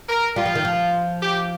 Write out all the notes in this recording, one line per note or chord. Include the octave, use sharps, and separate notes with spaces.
A#4
G3 F4
F3
D#3
F3
G4